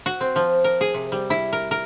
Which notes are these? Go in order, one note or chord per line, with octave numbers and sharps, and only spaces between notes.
F#4
C4
F3
A#4
G#4
C3
G3
E4
A#4
A#4